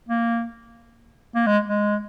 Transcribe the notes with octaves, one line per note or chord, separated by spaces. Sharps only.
A#3
A#3
G#3
G#3